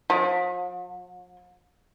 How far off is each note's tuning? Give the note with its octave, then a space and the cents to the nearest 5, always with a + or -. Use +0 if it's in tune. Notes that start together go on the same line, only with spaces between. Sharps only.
F3 +45